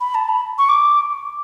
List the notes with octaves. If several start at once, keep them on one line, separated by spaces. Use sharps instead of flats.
B5
A5
B5
C#6
D6